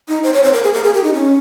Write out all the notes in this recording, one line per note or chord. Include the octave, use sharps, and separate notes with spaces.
D#4
C5
C#5
C5
A#4
G#4
A#4
G#4
G4
D#4
C#4